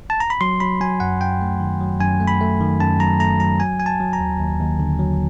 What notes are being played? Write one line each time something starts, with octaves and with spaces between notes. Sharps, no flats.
A5
A#5
B5
F#3 C6
F#3 B5
F#3 G#5
F#2 F#5
F#2 G5
A3
D#3
F#3
F#2 G#5
A3
B5
A3
D#3
F#2 A5
F#3 A#5
A3 A#5
F#3 A#5
F#3 G#5
F#3 G#5
A5
F#3
A#5
D#2
D#2
D#2
D3
F#3